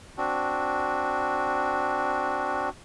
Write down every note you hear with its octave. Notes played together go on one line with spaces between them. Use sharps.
C4 D4 F#4